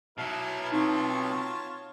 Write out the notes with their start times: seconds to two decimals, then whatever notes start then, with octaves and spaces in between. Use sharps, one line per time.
0.18 B2 F#3 E4 B4 F6
0.72 C4 D#4 F4 C#5 A5